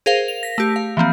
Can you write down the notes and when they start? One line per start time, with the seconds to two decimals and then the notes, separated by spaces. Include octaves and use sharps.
0.06 G#4 A#4 C5 F5
0.28 F7
0.43 A#6 B6
0.58 A3 G4
0.76 F5
0.97 E3 F3 A#3 C4